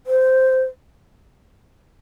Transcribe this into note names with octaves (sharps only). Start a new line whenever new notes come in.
C5